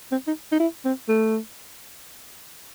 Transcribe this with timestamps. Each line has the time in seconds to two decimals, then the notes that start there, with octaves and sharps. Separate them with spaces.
0.11 C4
0.27 D#4
0.52 D#4
0.60 E4
0.85 C4
1.08 A3